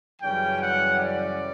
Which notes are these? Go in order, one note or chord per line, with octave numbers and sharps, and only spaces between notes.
F#2 C#3 E3 G3 C#4 G5
F#5
D5